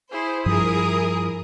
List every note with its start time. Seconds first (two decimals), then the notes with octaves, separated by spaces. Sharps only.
0.12 E4 G#4 C5
0.46 G2 F3 E4 G#4 A#4 D#6